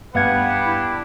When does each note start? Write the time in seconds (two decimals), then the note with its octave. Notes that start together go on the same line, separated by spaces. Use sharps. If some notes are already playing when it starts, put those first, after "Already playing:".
0.15 G2 B3 D4 G4 B4 F5 F#5 G#6
0.66 E4